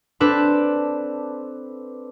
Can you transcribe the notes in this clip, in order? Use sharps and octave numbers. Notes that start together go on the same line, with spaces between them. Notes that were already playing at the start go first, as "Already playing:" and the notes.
C4 D4 A4 B4